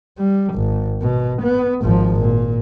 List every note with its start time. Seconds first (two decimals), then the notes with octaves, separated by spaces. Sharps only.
0.18 G3
0.54 G#1
1.02 B2
1.42 B3
1.82 G#1 F3
2.21 A#2